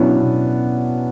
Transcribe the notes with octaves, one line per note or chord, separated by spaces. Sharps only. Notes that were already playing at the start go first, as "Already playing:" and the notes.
Already playing: B2 F#3 B3 C#4 D4 E4
B2